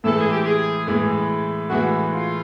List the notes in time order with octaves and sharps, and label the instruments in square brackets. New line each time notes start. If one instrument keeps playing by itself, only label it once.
[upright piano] A2 E3 G#3 [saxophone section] A4
[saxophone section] G#4
G4
G#4
[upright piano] A2 E3 G#3
[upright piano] A2 E3 G#3 [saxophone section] F#4
[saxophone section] F4